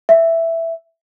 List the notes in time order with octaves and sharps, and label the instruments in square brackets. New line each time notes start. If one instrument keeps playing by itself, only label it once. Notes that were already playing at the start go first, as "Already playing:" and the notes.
[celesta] E5